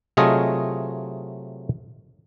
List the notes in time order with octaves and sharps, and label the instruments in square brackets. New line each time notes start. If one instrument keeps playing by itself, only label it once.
[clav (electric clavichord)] C3 F#3 A3 F4 G#4 D#5